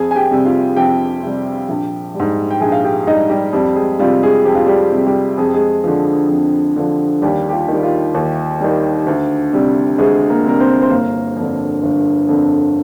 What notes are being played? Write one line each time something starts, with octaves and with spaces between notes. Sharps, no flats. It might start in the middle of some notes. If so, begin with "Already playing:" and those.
Already playing: F2 G#4 G#5
G#5
G4 G5
C3 G3
F4 F5
F2 G4 G5
C3 G3
A#1
G3
G#2
G5
A#1 G#4 G#5
F5
G4 G5
G#2 G3 D#4 D#5
G3 G4
F2 G3 G4
G#3 G#4
C3 G3 F4
G#3 G#4
F2 G4
F4
G3 G4
C3 G3
G3 G4
F2 G#4
G4
G#3 G#4
D3 F3
F2
D3 F3
D#2 G3 G4
G4
F4
D#3 G3
F4
D#2
D#3 G3
D2
C3 G3
D2 G#3 G#4
A#3 A#4
C3 G3 A#4
C4 C5
C5
G1 A#3 A#4
F2 D3
G1
F2 D3